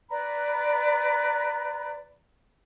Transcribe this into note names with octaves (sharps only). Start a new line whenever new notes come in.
B4 D5 A#5 B5